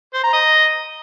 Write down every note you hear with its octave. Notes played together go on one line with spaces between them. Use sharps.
C5
A#5
D#5